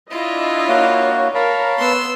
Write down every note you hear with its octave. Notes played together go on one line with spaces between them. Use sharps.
D4 E4 F4 D#5
A#3 F#4 C#5
A#4 C#5 F5 A5 B5
B3 C6 E6